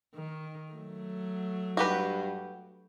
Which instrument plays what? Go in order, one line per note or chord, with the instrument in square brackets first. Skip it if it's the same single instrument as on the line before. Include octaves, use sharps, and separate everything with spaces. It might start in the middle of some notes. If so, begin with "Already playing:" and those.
[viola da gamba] D#3
F#3 A3
[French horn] G2 [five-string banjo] F#4 G4 B4